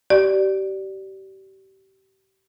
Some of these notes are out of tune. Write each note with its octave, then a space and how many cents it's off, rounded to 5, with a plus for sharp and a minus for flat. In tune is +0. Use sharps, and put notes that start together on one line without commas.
G4 -30 D5 +0